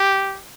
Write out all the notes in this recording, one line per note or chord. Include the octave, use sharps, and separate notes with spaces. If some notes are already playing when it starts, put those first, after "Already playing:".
Already playing: G4